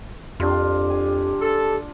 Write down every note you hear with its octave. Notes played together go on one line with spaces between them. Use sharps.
F2 D4 F4 G4
G#5
A4